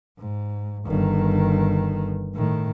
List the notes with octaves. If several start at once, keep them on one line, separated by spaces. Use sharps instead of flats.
G#2
G1 D#3
A2 D#3